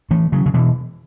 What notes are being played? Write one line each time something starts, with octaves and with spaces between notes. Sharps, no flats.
E3 A3
C#3 F#3
C#3
B2 E3